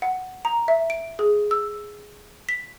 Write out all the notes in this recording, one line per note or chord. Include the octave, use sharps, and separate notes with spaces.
F#5
A#5
E5
D7
G#4
E6
B6